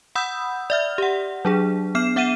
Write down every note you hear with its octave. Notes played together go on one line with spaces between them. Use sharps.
F#5 B5 D#6 E6 G6
D5 E5 F6
G4 F#5
F#3 D4 G#4
B3 F6 C7 E7
B3 E5 F#5 F6 D#7 E7